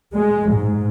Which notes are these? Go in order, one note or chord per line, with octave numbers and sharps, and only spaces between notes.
G#3
G#2